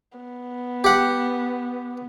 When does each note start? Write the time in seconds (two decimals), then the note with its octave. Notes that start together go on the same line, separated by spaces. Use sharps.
0.17 B3
0.84 G4 F#5